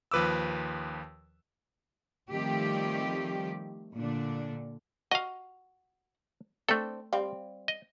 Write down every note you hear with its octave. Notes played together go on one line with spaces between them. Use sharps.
D#2 F3 B4 D6 E6
D#3 F3 G3 A3 C4 G4
A#2 D3 D4
F#4 D#5 F5
A3 C4 D4 A4
G3 C4 F5
D#5